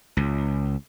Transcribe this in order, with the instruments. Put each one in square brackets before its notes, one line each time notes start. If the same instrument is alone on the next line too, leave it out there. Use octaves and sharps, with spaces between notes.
[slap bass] C#2